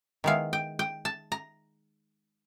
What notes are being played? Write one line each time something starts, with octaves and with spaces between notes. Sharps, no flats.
D#3 G#3 B3 E4 F5
G5
G5
A5
A#5